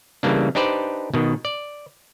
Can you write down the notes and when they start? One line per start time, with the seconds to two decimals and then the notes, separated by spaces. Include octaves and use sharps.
0.23 C#3 E3 G3 A#3 D4
0.55 D4 D#4 G4 B4 C5 D5
1.14 B2 D#3
1.45 D5